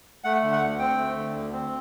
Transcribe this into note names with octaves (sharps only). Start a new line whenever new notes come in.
A3 F#5
D3
F#5
D2
C4 G5
A3
D3
D2
C4